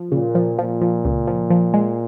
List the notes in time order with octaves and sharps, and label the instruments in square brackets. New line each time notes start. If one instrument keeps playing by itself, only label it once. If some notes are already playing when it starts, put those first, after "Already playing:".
Already playing: [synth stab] F3
[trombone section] A#2 [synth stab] C#3
[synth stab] F3
[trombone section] A#2 [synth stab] F3
[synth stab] F3
C#2
F3
F3
G#3